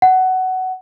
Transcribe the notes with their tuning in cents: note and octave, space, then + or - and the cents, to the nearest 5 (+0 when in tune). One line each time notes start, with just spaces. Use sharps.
F#5 +15